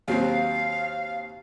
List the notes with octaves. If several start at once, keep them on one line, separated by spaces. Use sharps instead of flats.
D#2 F#3 C4 F5